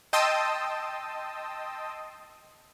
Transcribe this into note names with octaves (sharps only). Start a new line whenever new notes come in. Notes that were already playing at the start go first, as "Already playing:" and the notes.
D#5 G5 A5 C6 D#6 E6